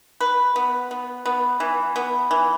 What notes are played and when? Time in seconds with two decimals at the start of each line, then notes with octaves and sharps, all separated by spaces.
0.21 B4
0.56 B3
0.91 B3
1.26 B3
1.60 E3
1.96 B3
2.31 E3